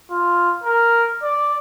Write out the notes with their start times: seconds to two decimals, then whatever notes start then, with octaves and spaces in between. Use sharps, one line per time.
0.11 F4
0.63 A#4
1.23 D5